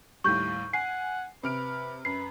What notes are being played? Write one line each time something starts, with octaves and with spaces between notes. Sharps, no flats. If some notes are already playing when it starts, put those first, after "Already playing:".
D#2 A2 G3 C#6 G6
F#5 G#5 C7
C3 B4 F6 D7
F#2 B4 C7